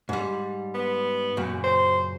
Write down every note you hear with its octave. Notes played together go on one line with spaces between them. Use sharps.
G#2 G3
B3
F#2 A#2 C#3
C5